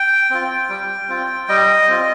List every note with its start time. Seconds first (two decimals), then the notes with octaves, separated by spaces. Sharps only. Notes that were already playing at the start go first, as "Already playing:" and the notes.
Already playing: G5
0.30 C4 F4
0.69 G3
1.09 C4 F4
1.48 G3 D#5
1.88 C4 F4